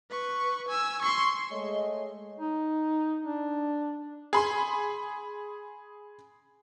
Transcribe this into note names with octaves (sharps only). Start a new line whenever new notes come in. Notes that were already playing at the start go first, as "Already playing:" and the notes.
B4 C#6
G#5 E6
C6 C#6
G#3 A3 G#4 C#5 D#5
D#4
D4
G#4 B5 C6